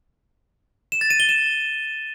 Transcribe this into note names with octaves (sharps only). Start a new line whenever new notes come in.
E7
A6
D#7
G7
E7